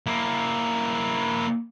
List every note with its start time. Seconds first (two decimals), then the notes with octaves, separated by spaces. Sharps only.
0.07 A#3 E4